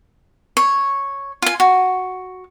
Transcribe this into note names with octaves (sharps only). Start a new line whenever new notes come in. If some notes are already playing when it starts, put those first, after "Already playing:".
C#5
F4 G#5
F#4